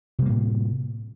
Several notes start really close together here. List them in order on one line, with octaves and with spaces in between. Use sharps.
C3 G3 A#3 A2